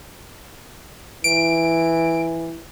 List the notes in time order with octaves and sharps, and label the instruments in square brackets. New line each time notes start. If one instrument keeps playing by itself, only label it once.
[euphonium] E3 [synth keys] D7